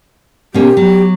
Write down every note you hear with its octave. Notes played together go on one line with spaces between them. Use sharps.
B2 A#3 C#4 G4
F#3